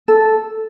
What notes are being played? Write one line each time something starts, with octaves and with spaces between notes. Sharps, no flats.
A4